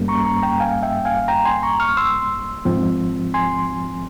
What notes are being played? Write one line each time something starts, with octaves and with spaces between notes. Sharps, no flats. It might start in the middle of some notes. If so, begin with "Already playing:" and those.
Already playing: G2 G3 A#3 C#4
A#5 C#6
A#5 C#6
G5 A#5
F5 G#5
E5 G5
F5 G#5
G5 A#5
G#5 C6
A#5 C#6
C#6 F6
C6 E6
G#2 F3 C4
G#5 C6